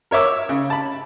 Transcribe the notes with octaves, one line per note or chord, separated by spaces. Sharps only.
A#4 C#5 E5 D6 E6
C#3
A5 B5